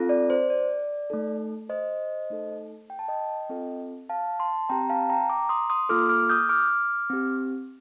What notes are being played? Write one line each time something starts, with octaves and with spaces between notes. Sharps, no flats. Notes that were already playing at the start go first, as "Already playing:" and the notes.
Already playing: C4 F4 A4
D5
C5
D5
A3 D#4 A4
C5 D#5
A3 D#4 A4
G5
A5
D#5 G5
C4 F4 A4
F5 A5
A5 C6
C4 G4 G5 A#5
F5 A5
G5 A#5
A#5 D6
C6 D#6
C6 D#6
A#3 F4 A4 D6 F6
D6 F6
D#6 G6
D6 F6
C4 G4